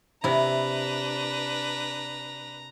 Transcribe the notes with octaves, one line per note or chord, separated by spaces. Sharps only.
C3 D4 E4 B4 A#5